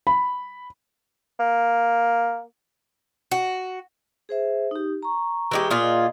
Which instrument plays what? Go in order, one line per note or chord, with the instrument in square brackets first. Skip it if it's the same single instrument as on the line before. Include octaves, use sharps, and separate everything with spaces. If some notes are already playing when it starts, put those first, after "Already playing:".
[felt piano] B5
[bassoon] A#3
[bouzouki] F#4
[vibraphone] G#4 C5 E5
D#4 G4
A#5 C#6
[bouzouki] E3 G#3 G4
A#2 F4 G#4
[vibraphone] D#5